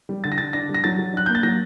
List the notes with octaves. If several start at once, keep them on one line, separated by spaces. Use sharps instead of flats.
G3
D3 A6
A#6
D3 A6
D4 A#6
G3
A#6
F#3 A6
F#3
D4 F#6
A#3 G6
A6
F#3 A#6